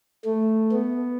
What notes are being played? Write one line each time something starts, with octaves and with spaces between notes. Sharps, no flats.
A3
B3